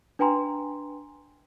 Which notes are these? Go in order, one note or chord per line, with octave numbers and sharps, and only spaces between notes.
D4 B4 G5 G#5 A#5 C6